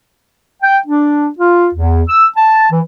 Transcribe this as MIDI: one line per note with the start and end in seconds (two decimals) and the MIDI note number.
0.63 0.78 79
0.86 1.29 62
1.38 1.68 65
1.74 2.02 40
2.09 2.26 88
2.36 2.66 81
2.71 2.80 52